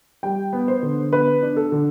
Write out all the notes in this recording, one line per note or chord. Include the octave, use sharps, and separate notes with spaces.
G3 G5
B3
C5
D3
B3 B4
D4
A4
D3